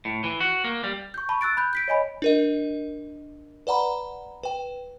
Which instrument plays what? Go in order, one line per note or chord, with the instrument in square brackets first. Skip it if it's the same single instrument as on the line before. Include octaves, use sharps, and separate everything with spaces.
[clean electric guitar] A2
E3
F#4
A#3
G3
[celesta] C#6 G6
A5 B5 C#6
E6 F#6 A6 D7
B5 F#6 G6
G6 B6 D7
C#5 D#5 G#5 B5
[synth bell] D4 A#4 D#5
B4 D5 F#5 A#5 B5
B4 G5